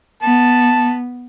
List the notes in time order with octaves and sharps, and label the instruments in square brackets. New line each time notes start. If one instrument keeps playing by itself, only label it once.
[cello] B3 [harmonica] A5